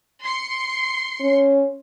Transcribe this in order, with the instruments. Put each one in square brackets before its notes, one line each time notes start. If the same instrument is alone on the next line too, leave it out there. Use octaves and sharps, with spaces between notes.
[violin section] C6 C7 C#7
[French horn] C#4